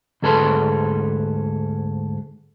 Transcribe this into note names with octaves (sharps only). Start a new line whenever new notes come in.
D2 G#2 G#4 A4 B4 C6